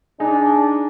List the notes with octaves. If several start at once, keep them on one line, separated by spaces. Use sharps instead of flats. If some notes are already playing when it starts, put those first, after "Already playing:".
D4 D#4 G#4